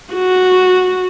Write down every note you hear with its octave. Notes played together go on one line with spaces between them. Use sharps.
F#4